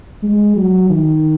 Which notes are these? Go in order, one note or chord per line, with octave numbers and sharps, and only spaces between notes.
G#3
F#3
D#3